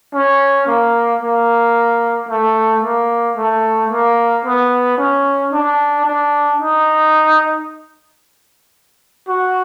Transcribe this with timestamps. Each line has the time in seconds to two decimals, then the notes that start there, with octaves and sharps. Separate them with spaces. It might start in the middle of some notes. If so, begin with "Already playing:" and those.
0.14 C#4
0.67 A#3
1.21 A#3
2.29 A3
2.83 A#3
3.36 A3
3.90 A#3
4.45 B3
4.98 C#4
5.52 D4
6.05 D4
6.60 D#4
9.28 F#4